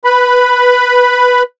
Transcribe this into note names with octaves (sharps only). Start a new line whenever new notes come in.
B4 B5